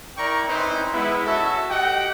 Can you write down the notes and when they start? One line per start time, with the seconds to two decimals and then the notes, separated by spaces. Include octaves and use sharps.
0.17 E4 A#4 D5 G5 A#5 C#6
0.48 C4 C#4 D#4 E4 B4 C5
0.93 G#3 B3 E4
1.25 C#4 F#4 A4 E5
1.70 G4 D#5 F#5 G5